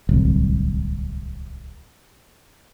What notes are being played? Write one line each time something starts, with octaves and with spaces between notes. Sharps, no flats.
D1 C2